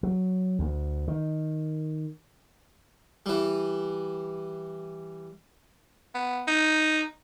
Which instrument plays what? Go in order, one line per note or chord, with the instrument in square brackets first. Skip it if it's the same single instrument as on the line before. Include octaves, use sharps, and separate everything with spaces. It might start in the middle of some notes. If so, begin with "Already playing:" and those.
[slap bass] F#3
D2
D#3
[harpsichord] E3 G3
[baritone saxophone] B3
D#4